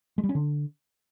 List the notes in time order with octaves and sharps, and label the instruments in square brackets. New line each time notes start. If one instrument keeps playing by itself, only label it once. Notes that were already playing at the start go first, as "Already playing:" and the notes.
[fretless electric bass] G#3
G3
C#4
D3